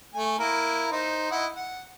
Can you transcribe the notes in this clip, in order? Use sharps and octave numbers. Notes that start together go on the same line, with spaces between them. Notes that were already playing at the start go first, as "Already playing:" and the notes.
A3 G#5
A#3 E4 A#4
D#4 C5
E4 D#5 F#5
F#5